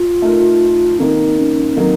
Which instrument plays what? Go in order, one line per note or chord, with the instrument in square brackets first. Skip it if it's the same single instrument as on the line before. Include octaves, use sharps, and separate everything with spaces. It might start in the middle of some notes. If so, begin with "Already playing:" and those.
Already playing: [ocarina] F4
[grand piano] A3 D#4 A#4
[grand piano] D#3 A#3 D#4 [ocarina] C4
[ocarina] C#4
[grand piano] D#3 F#3 A#3 D#4 [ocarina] C4